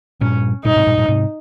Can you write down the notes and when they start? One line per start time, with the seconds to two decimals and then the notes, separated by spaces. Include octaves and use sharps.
0.21 G2 A#2 C#4
0.64 G2 A#2 D#4
0.76 G#2 C3
0.87 G2 A#2
0.98 G2 A#2
1.08 G#2 C3